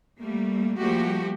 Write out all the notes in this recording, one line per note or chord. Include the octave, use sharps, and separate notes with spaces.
G3 A3 A#3
F3 G3 A3 A#3 F#4 G4